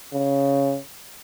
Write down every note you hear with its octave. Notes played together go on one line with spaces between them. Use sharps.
C#3